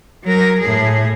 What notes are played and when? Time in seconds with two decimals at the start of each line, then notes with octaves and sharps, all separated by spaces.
0.23 F#3 A#4
0.60 A2 G#4